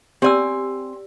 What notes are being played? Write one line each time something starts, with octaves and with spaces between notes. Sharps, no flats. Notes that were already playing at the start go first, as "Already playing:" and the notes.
C4 G4 D5 G#5 E6